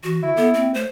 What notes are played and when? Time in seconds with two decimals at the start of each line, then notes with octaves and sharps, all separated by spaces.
0.04 E3 F#4
0.23 D3 E4
0.37 B3 A4
0.54 A#3 C4
0.74 A3 C5